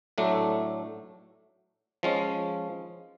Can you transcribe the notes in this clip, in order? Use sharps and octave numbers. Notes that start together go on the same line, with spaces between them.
A2 F#3 A3 D4
F3 G#3 C#4